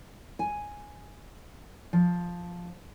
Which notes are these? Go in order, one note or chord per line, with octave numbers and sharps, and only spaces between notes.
G#5
F3